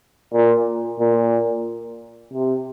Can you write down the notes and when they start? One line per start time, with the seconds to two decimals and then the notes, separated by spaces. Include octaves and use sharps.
0.33 A#2
1.00 A#2
2.33 C3